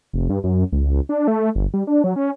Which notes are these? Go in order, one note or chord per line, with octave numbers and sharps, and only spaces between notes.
F1
G2
F#2
C#2
D4
A3
G1
G3
D4
F#3
C#4